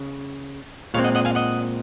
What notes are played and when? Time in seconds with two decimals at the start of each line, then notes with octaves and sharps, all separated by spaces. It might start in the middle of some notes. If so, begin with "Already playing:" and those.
Already playing: C#3
0.94 A#2 G#3 C4 C#5 F5
1.04 D#5 F#5
1.15 D#5 F#5
1.25 F5 G#5
1.35 D#5 F#5